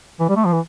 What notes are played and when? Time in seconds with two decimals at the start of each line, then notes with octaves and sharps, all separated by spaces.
0.20 E3
0.29 G3
0.36 A3
0.45 F3
0.53 E3